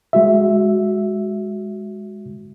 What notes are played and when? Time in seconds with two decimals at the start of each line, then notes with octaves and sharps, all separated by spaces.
0.13 G#3 F#4 E5